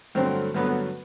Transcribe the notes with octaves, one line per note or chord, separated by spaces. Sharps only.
G2 D3 F#3 A3 C4
G2 D3 F#3 A3 B3